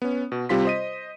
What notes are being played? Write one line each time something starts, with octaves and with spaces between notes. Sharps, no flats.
B3 C#4
B2
C3 G3 C4 F4 C6 B6
C5 D#5 D#7